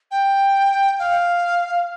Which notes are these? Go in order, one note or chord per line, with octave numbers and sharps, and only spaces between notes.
G5
F5